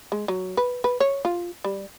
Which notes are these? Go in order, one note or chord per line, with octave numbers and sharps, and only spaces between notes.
G#3
F#3
B4
B4
C#5
F4
G3